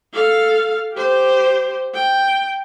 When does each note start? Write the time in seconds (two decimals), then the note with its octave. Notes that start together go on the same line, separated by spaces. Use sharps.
0.14 A4 F5
0.94 G4 C5
1.95 G5